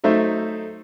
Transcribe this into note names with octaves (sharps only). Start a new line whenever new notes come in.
F#3 A3 D#4 C5 E5